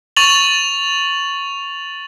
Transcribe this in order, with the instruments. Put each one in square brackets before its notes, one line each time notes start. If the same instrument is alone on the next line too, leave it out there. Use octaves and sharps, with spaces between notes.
[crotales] C#6 A6 F7 F#7